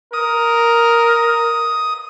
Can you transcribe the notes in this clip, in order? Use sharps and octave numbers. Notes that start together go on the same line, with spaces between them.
A#4 D#6